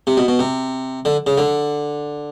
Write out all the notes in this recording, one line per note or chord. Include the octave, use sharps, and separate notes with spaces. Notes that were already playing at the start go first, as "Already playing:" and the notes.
C3
B2
B2
C3
D3
C#3
D3